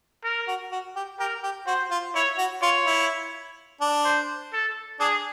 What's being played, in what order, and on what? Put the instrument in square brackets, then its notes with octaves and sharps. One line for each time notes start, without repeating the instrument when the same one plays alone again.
[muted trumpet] A#4
[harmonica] F#4
F#4
G4
[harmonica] G4 [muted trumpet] A#4
[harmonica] G4
[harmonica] F#4 [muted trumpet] C5
[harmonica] F4
[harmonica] E4 [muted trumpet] C#5
[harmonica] F#4
[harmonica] F4 [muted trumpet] C#5
[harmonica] E4
D4
[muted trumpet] C5
A4
[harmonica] D4 [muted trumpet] G#4